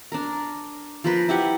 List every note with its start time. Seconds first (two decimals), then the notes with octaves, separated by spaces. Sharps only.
0.12 D4 A#4
1.04 F3 A#4 B4
1.29 E4 G4 F#5